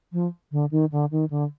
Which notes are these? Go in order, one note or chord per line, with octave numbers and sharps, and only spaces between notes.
F3
D3
D#3
D3
D#3
D3